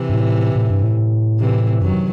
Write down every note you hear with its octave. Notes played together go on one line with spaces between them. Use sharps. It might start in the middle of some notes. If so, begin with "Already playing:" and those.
Already playing: C3 E3
G2
A2
A2
G2
A2
C3 E3
F#2 D#3 F#3